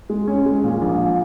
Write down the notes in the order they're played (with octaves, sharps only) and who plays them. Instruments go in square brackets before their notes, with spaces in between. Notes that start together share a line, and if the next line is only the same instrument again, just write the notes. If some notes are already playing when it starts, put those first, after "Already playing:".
[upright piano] G#3
C#4
G#3
A#2
A#1